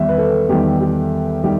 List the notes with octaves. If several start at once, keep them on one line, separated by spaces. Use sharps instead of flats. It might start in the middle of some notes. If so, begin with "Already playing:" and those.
Already playing: E2 D#3 G3 E5
B4
A4
E2 D#3 G3 G4
G4
D#3 G3 G4